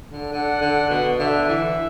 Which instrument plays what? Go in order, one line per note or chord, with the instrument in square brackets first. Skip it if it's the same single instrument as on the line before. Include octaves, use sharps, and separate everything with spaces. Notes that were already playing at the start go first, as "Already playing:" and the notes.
[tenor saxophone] D3
[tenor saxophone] D3 [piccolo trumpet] F#5
[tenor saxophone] D3
B2
[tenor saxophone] D3 [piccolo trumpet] E5
[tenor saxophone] E3